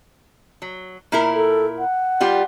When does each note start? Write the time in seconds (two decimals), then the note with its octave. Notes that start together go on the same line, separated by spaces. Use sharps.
0.62 F#3
1.12 A#2 E4 A#4
1.35 A4
1.79 F#5
2.20 G3 F4 G4